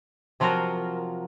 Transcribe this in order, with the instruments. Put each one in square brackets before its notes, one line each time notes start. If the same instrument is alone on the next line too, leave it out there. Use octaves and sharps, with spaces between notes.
[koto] C3 F3 F#3 F4 F#4 A#4